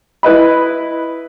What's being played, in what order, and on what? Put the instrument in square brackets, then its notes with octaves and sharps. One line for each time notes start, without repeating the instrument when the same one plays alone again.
[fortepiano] E4 B4 D#5 B5